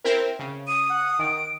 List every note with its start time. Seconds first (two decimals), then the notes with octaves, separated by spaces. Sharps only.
0.04 C4 E4 A#4
0.39 C#3
0.67 D#6 D#7
0.89 F#5
1.19 D#3 D7